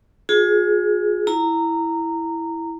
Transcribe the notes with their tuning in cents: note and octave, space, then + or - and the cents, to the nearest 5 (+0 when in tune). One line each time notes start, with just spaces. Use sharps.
F4 +40 G#4 +5
E4 +0 A#5 -15